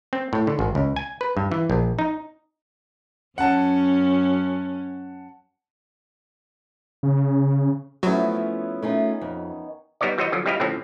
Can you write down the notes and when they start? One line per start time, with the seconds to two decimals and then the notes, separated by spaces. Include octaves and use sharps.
0.13 C4
0.33 A2
0.47 D3
0.59 G#1
0.75 C#2
0.96 G#5
1.21 B4
1.37 G2
1.52 E3
1.70 A#1
1.99 D#4
3.38 F#2 C#4 F#5 A5
7.03 C#3
8.03 F3 F#3 A3 B3 C#4 E4 F#4
8.82 D#3 A3 C#4 F4
9.21 F2
10.01 G3 B3 D#4 C#5 D5
10.18 E3 G3 F#4 C5 C#5 D#5
10.32 D3 F3 F#3
10.46 G3 C4 E4 G4 D#5 F5
10.60 A2 D3 F3 C4 C#4